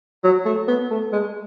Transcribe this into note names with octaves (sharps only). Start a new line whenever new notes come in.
F#3
A3
B3
A3
G#3